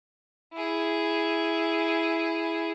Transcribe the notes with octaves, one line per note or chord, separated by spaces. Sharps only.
E4 G#4